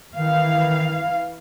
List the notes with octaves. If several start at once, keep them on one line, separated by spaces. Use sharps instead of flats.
D#3 E3 F5